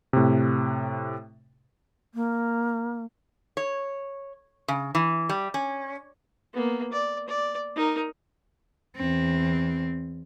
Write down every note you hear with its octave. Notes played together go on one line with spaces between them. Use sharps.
A2 C3
A#3
C#5
C#3
E3
G3
C#4
A#3 B3
D5
D5
D#4 A#4
E2 C4